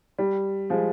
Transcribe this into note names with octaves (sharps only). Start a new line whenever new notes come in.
G3
F3 G#3